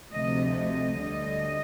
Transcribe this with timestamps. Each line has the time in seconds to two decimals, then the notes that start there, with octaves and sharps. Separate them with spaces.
0.13 D2 C3 F3 A3 D#5
0.53 D#5
0.93 D2 D3 G3